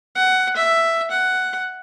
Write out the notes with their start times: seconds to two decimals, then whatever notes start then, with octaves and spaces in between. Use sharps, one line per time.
0.15 F#5
0.56 E5
1.11 F#5